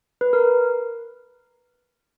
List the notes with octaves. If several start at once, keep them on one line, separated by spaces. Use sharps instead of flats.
B4
A#4